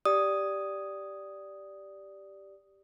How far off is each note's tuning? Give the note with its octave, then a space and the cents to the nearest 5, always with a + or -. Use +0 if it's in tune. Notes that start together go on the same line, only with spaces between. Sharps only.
G4 +0 D5 +0 D#6 +0